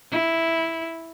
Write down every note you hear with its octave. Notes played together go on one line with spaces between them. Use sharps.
E4